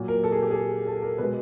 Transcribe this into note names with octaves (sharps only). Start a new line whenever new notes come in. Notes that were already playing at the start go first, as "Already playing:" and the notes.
Already playing: A#2 F#3
A#4
A4
G#4
G4
G#4
A4
A#4
B2 G#3 B4